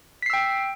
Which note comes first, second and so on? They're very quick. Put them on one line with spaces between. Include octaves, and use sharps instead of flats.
B6 C7 E6 G5